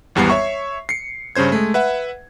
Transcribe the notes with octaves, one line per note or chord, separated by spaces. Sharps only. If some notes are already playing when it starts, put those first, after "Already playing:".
G#1 E2 G3 B3 C7
C#5 E5 C#6
C7 C#7
G2 C#3 C#4 C5 G#6
G#3 A3
B4 E5 F#5